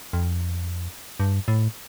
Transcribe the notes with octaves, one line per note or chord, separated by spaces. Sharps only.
F2
G2
A2